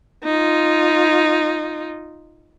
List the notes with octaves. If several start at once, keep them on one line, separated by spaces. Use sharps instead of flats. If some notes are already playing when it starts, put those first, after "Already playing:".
D#4 F4